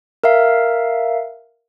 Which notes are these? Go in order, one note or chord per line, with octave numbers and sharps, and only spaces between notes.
A#4 E5 F5